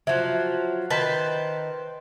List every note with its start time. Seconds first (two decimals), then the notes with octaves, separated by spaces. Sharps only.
0.07 F3 F#3 E5
0.90 D#3 B4 C5 A5